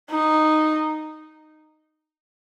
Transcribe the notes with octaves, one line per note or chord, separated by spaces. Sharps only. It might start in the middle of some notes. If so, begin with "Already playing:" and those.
D#4